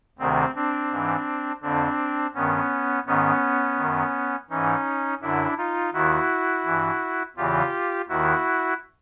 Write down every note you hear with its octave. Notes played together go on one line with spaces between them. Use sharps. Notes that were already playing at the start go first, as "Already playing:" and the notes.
D2 C3 D#3 C4
C4 D4
G#2 E3
F2 D3 C4 D4
G2 D#3 B3 C#4
G#2 D#3 B3 C#4
F#2 D#3
G#2 E3 C#4 D#4
F#2 D3 D4 E4
D#4 F4
D#2 D#3 E4 F#4
G2 E3
E2 C#3 E3 F4 G4
D#2 D#3 E4 F#4